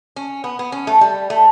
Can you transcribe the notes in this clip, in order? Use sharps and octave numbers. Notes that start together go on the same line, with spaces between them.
C#4
B3
B3
C#4
A3
G3
A3